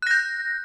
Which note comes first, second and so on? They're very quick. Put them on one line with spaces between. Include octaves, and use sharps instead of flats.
F#6 A#6 G6